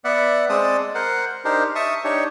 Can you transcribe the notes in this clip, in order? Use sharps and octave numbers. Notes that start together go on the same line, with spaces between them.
B3 D5 E5 F#5
G#3 C4 D5 A5 D#6
A#4 C5 F#5
D4 D#4 G4 A#4 C5
E5 A5 C#6 D#6
D4 D#4 G4 C#5